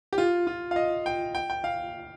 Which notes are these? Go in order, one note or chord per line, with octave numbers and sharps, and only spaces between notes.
G4
F4
F4
F5
D#5
G5
G5
G5
F5